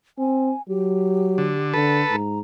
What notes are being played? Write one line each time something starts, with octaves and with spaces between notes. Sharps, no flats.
C4 G#5
F#3 G4
D3
D3 A4 B4
G#2 A#5